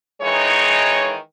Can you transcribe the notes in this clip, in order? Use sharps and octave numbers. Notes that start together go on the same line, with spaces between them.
D#3 E3 G#3 D#4 C#5